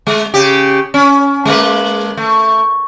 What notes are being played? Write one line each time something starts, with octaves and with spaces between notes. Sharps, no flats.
G#3
C#3 G4
C#4
G#3 A#3 B4
A3